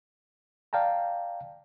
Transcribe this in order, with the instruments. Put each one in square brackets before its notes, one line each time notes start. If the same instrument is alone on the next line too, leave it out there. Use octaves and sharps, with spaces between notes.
[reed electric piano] D5 F5 G5 A5 A#5